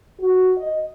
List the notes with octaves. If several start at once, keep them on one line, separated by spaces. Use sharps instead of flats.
F#4
D#5